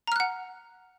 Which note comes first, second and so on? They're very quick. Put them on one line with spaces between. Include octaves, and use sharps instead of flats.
A#5 F6 F#6 F#5